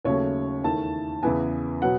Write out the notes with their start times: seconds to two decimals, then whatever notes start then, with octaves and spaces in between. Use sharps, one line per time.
0.05 D#2 C#3 F#3 A3 C#5
0.64 E2 D#3 A3 A5
1.23 E2 C#3 E3 B3 G#5
1.82 B2 F#3 B3 F#5